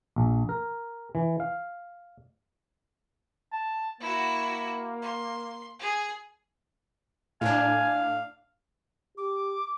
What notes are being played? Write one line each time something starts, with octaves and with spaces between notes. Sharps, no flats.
A#1
A#4
E3
F5
A5
A#3 E4 F#4
C6
G#4
A2 D4 F5 G#5
G4 D6